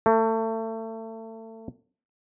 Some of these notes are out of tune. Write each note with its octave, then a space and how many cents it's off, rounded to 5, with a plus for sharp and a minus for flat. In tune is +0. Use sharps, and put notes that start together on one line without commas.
A3 +30